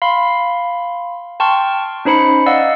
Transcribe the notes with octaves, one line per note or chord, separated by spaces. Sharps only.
F5 B5 C6
G5 A5 C6 C#6 F6
C#4 D#4 C5 B5 C#7
D5 D#5 F5 F#5 E6